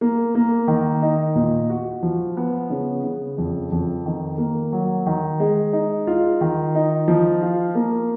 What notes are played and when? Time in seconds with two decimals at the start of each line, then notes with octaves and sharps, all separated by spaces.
0.01 A#3
0.35 A#3
0.68 D#3
1.02 D#4
1.35 A#2
1.70 F#4
2.03 F3
2.37 B3
2.70 C#3
3.04 C#3
3.38 F2
3.72 F2
4.05 D#3
4.38 A#3
4.72 F#3
5.06 D#3
5.40 G#3
5.73 D#4
6.07 F4
6.41 D#3
6.75 D#4
7.08 F3
7.42 F4
7.75 A#3